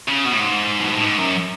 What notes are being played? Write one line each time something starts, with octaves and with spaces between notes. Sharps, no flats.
C#3
B2
A2
G#2
B2
A2
G#2
F#2